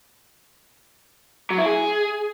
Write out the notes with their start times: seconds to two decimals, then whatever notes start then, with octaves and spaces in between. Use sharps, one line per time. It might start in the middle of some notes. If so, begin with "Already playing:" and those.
1.50 F#3
1.58 E4
1.66 G#4